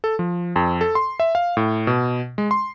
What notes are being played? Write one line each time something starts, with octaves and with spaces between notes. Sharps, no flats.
A4
F3
F2
A4
C6
E5
F5
A2
B2
G#3
C6